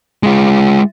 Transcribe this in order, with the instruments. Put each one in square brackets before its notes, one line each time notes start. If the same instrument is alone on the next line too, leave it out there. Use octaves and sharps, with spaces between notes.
[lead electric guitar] G#3 F4